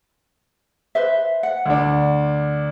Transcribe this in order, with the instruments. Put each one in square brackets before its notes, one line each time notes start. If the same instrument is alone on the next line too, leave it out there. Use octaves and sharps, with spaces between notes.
[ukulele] B4 C5 E5
F#5
[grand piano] D2 D4